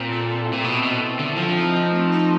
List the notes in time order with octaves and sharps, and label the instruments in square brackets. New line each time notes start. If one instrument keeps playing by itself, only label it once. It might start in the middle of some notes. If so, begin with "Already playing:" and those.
Already playing: [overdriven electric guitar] A#2 [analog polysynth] C4
[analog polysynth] A4
A4
E4
[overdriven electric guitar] A#2
[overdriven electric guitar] B2 [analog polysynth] C4
[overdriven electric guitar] B2 [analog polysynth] A4
[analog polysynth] C4
[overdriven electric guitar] D3 [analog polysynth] A4
[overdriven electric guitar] F3 [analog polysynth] C4
[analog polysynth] D#4
C4
A3
D#4